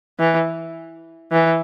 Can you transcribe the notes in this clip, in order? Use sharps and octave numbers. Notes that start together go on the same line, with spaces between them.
E3
E3